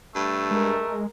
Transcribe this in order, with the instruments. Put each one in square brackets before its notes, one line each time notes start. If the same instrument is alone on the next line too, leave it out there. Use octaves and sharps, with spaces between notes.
[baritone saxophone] G2 [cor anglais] A3
[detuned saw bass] G#3 [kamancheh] A#4